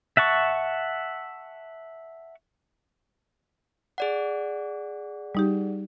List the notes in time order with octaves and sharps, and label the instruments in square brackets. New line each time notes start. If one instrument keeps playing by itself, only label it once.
[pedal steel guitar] E5 F#5 A5 C#6
[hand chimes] G#4 D5 F#5
[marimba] G3 D#4 G4